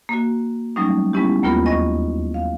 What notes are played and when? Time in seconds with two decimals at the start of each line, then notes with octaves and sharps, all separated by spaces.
0.09 A#3 F#4
0.76 F#3 G3 A3 C#4 D#4
1.13 G3 G#3 B3 C#4 E4 G4
1.43 D#2 A#3 B3 F4 A#4 B5
1.66 E2 D#5 C#6 A#6
2.34 F5